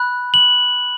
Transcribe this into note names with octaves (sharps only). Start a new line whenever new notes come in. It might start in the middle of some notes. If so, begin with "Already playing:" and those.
Already playing: B5 F#6
F#7